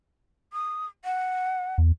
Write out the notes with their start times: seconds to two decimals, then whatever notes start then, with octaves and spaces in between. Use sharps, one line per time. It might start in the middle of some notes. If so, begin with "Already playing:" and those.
0.53 D#6
1.05 F#5
1.78 E2